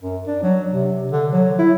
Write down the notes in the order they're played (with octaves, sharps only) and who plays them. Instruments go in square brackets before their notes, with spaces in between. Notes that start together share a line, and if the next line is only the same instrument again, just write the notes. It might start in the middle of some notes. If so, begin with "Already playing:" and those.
[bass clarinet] F#2
D4
F#3
C3
D3
F#3
E4